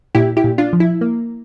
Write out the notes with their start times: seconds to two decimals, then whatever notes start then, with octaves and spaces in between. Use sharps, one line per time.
0.15 A#2 E4 G4
0.37 E4 G4
0.44 A#2
0.58 D4 F4
0.73 F3
0.80 E4
1.01 A#3